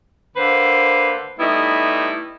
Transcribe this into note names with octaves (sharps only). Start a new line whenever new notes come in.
D3 A#3 B4 C5
G3 A3 B3 D#4 E4